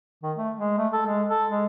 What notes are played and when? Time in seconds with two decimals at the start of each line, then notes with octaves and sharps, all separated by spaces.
0.23 D#3
0.37 A3
0.57 G#3
0.78 A3
0.93 A4
1.06 G#3
1.28 A4
1.50 G#3